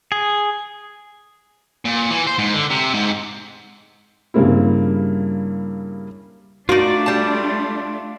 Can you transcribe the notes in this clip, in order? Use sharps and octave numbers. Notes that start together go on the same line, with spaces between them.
G#4
A#2
E3
C5
G#2
D3
C3
G#2
G2 C#3 G3 A#3 C4 E4
A3 D4 D#4 F4 F#4 A#4 D5
G3 A5